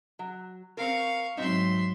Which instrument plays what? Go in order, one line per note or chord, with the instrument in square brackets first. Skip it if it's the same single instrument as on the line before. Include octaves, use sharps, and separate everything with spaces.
[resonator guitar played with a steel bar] F#3
[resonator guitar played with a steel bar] C4 A#4 [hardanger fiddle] F5 C#6
[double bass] G#2 F#3 [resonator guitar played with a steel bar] C4 D#4 [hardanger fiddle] E5 C6